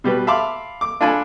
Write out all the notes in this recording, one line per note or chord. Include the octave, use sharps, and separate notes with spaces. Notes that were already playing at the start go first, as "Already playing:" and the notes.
B2 G3 G4 B4
E5 F5 A5 B5 C6 D6
D6
D4 F4 A4 G#5 B5